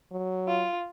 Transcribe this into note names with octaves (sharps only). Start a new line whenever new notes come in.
F#3
F4